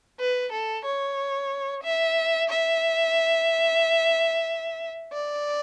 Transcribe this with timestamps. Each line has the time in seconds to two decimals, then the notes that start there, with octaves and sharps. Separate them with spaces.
0.19 B4
0.52 A4
0.85 C#5
1.83 E5
2.49 E5
5.13 D5